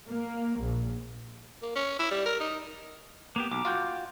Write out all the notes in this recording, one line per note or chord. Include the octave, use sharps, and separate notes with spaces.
A#3
A#1
A#3
C#4
E4
G3
A#4
D#4
A#3 B3 G4
B1 D6
F4 F#4 G5